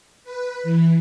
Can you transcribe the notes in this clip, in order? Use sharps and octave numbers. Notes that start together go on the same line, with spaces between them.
B4
E3